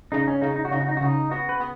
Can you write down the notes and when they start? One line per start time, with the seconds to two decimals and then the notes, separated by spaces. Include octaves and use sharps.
0.12 C#3 D#4
0.27 C#4
0.41 C#3 D#4
0.56 D#4
0.65 F#4
0.71 C#3 D#4
0.81 F#4
0.88 D#4
0.97 F#4
1.01 C#3 D#4
1.31 B3 F#4
1.49 B4
1.60 B3